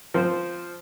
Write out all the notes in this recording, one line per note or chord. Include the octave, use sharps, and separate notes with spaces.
F3 C4 C5